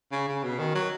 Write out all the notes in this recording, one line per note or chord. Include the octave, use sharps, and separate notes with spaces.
C#3
C#3
B2
D#3
F#3